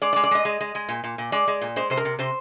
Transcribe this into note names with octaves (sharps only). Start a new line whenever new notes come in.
G#3 D5
D5
G#3
D5
G#3 D#5
G#3
G#3
G#3
A#2
A#2
A#2
G#3 D5
G#3
A#2
G#3 C5
C3 C5
A#4
C3
C3 C5